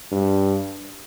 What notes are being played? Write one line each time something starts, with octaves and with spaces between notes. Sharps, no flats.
G2